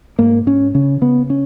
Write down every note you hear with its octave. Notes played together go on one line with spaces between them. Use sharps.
G#2 A#3
G#2 C#4
C#3 C#4
C#3 B3
C#4